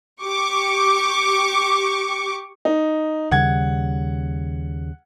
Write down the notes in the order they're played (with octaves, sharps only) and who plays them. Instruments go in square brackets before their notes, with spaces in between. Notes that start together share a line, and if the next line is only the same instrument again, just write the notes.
[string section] G4 C#6 D6
[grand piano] D#4
[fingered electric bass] D#2 C#3 G3 [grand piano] F#5 G#6